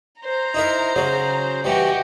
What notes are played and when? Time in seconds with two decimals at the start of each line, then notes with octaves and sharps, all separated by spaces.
0.21 C5 A#5
0.54 D#4 E4 A#4
0.96 C#3 F#3
1.64 E3 G3 F#4 G4 D#5